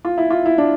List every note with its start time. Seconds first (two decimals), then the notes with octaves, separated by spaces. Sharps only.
0.05 F4
0.18 E4
0.31 F4
0.46 E4
0.58 D4